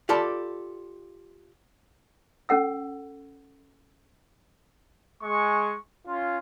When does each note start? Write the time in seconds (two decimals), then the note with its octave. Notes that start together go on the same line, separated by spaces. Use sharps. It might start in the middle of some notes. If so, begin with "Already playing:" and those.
0.09 F4 G4 A4 D5 A5 B5
2.49 C#4 A4 F#5 E6
5.23 G#3 C#6
6.08 C#4 F4